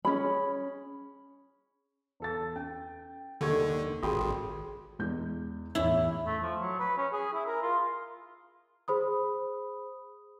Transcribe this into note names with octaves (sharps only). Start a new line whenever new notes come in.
C#4 G#4 B5
E2 A4 A6
C#4 G5
D#2 D3 G4 A4 D6 E6 G#6
G#1 F4 F#4 G#4 G5 C6 D#6
E2 G#3 G6
E2 A2 C#4 E4
A3
F3
F#3
B4
C#4
G#4
E4
A#4
F4
G#4 C5 B5 D#6